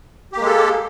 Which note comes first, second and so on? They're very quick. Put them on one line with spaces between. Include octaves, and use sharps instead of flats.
G4 A#3 G#3 A4